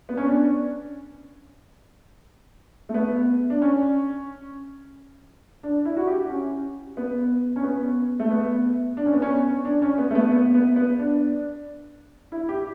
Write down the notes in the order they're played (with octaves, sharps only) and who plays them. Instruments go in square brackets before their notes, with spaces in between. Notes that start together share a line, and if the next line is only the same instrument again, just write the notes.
[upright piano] B3
C#4
D4
A3
B3
D4
C#4
D4
E4
F#4
G4
C#4
B3
C#4
B3
A3
B3
D4
C#4
B3
C#4
D4
C#4
B3
A3
B3
B3
B3
B3
D4
E4
G4